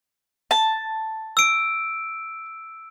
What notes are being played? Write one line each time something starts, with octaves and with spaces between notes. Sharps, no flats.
A5
E6 D7